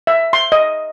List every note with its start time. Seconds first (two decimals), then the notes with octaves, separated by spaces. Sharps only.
0.07 E5
0.33 C6
0.52 D#5